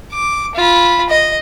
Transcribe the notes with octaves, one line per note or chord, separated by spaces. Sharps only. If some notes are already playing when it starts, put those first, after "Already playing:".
D6
F4 B5
D#5